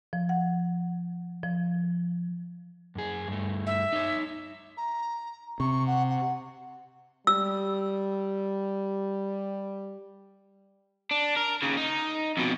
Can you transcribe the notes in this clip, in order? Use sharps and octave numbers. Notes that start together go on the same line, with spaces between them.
F3
F#5
F3
F#2 G#4
G2 A3
E5
D#4 C#5
A#5
C3 C#6
F#5
F#5
G3 E6
D4
A#4
D#2 C#3
D#4
F2 B2